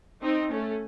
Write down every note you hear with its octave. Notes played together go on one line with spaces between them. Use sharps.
C4 D#4
A3 C#4